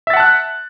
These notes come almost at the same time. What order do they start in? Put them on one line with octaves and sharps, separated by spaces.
E5 A6 F#5 A5 F#6